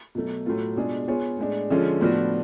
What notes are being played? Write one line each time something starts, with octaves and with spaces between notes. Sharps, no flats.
B2 F#3 A3
A2 F#3 A3 F4
B2 G#3 D4 F4 G#4
B3 F4 G#4 C#5
A2 G#3 D4
D3 F3 G#3 C#4 F4
A2 F3 B3 D4 F#4